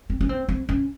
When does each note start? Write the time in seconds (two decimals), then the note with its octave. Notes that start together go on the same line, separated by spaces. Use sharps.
0.10 C4
0.21 C#4
0.29 C4
0.49 C4
0.69 C#4